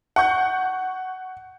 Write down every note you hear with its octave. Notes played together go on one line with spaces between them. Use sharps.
F#5 C#6 G6